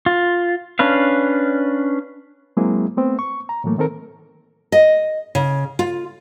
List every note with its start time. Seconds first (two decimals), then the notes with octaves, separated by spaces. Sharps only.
0.06 F4
0.79 C#4 D4 B4 F5
2.57 F#3 G#3 A#3 C4 E4 G#4
2.97 A3 B3 C4
3.19 C#6
3.49 A#5
3.64 A2 E3 F#3 A3 A#3
3.78 D#3 C4 A4 A#4
4.72 D#5
5.35 C#3
5.79 F4